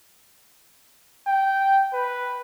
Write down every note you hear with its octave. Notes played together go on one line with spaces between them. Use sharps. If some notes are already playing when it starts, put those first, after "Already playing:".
G5
B4